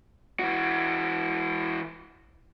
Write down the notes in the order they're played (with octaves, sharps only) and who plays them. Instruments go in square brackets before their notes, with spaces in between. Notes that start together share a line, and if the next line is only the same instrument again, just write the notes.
[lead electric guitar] E3 F#4